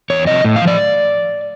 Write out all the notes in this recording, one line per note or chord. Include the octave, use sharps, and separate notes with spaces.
E2 C#5
C3 F3 D#5
A2
F5
F3
D5